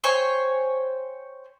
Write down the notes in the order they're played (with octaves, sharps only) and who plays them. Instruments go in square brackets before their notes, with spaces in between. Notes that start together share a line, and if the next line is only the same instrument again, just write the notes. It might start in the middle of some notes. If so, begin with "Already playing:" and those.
[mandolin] C5 C#5 G5 G#5